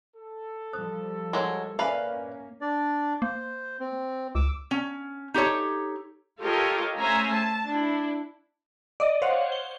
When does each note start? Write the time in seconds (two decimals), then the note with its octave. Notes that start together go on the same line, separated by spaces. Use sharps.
0.16 A4
0.73 F3 G3 C5 D#6
1.33 F#3 G#3 A#4 C6
1.79 A#3 C#4 B4 C5 D5 E5 F5 G#5
2.61 D4 D5
3.22 A#3 C5
3.80 C4
4.35 C#2 D6 E6
4.71 C#4
5.34 D#4 G4 A4 C#5
6.41 F4 G4 A4 A#4 C#5 D#5
6.97 A3 C#4 C5 E5 G#5 A#5
7.34 A5
7.67 D4 E4
9.00 D5 D#5
9.22 C5 C#5 F5 F#5
9.52 G7